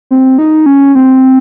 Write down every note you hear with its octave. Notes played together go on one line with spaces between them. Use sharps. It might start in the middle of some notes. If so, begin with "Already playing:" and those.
C4
D#4
C#4
C4